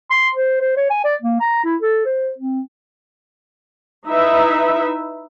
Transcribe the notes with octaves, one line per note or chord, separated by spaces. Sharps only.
C6
C5
C5
C#5
G#5
D5
A#3
A#5
E4
A4
C5
C4
D#4 E4 B4 E5